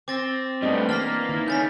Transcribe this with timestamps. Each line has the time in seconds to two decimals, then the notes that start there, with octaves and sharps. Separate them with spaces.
0.08 C4 D6 A6 A#6
0.62 G3 A3 B3 D4 D#5
0.89 E3 A#3 F6 A6 B6
1.29 D#3 E4
1.48 C#3 C#4 G6 A6 B6